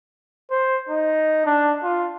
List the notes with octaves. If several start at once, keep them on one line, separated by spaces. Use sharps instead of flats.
C5
D#4
D4
F4